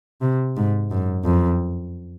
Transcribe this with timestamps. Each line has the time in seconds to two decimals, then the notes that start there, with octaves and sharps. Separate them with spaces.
0.21 C3
0.56 G#2
0.91 F#2
1.24 F2